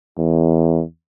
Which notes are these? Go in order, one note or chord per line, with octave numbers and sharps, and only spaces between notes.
E2